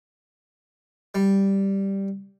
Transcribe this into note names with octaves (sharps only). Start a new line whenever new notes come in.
G3